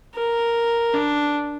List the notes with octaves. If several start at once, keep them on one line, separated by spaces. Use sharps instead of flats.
A#4
D4